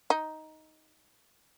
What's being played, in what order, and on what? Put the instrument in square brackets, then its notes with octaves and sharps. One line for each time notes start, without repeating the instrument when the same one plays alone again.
[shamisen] D#4